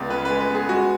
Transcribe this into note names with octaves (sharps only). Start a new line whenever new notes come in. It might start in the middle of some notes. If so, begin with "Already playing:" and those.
Already playing: C#2 G#3 B3 D5
C#3 B4
G#3 B4
B4
B3
G#4
G#3 F#4